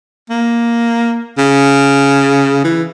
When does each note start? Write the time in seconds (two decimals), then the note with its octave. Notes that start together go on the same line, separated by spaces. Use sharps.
0.30 A#3
1.38 C#3
2.64 E3